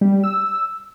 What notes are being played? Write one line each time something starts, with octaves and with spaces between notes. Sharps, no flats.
G3
E6